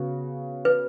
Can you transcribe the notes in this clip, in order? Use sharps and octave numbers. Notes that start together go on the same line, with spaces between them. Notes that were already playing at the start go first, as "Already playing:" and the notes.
Already playing: C#3 B3 F#4
B4